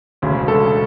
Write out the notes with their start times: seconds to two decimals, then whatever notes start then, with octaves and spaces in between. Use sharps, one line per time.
0.22 E1 D2 C#3
0.48 A4